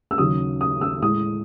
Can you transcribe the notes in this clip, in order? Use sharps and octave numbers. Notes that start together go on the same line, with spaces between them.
E6
D#2 C#3 F#3 D#6
D#6
E6
A2 G#3 D#6